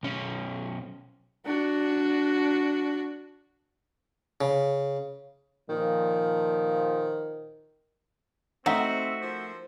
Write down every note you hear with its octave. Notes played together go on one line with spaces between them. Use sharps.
B1 C#4
D4 F#4
C#3
A#2 D#3 F3
A3 C4 D#4 F#4 E5 F#5
F3 A#4 C5